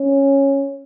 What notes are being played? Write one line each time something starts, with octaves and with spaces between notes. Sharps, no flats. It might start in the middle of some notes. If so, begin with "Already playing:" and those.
Already playing: C#4